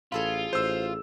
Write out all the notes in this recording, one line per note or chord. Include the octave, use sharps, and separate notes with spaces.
A1 F4 G#4 A4 B5
A1 C5 E6